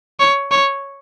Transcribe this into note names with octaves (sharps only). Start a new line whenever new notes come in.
C#5
C#5